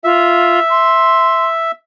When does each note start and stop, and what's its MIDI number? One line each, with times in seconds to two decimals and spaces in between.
0.04 0.59 65
0.04 1.71 76
0.69 1.47 84